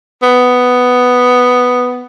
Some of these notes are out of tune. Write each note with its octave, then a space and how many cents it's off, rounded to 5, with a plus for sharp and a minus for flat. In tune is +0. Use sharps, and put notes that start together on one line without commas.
B3 +5